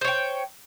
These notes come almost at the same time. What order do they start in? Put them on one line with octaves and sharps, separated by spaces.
C5 C#5 G5